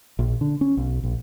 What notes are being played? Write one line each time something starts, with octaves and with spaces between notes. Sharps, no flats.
A#1
D3
C#4
B1
A#1